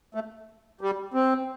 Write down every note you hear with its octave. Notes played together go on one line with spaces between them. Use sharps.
A3
G3
C4